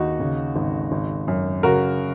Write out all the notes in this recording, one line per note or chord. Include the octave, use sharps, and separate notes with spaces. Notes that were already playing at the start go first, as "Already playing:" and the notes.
Already playing: D#2 D#4 F#4
C#3
G#1
G#1
F#2
C#3 F#4 A#4